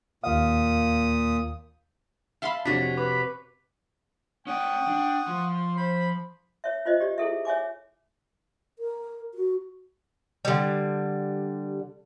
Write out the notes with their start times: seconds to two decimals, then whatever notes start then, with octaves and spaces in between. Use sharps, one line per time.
0.24 D#2 A#2 F5 D#6
2.42 E5 F5 A5 B5 C6
2.65 F2 C3 D4 F#4 C#5 B6
2.97 B4 D6
4.47 C#4 D5 F#5 G5 C#6 D#6
4.88 D4
5.28 F3 C6
5.77 C5 B5
6.64 C#5 E5
6.85 F4 C5 D#5
7.00 G4 D5
7.18 E4 G#4 A4 E5
7.45 C#5 E5 G#5 D6
8.79 A#4
9.34 F#4
10.45 D3 G3